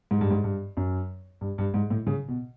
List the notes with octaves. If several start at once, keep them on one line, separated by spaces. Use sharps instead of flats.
G#2
G2
G#2
G2
F#2
G2
G2
G#2
A2
C#3
B2